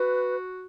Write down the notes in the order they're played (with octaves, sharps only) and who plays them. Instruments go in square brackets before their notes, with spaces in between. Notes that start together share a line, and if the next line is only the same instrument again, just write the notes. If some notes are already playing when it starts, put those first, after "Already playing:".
Already playing: [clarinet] F#4 [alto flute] B4